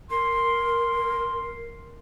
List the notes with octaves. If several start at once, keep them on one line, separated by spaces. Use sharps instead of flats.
A#4 C6